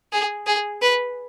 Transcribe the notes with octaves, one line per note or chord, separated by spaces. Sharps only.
G#4
G#4
B4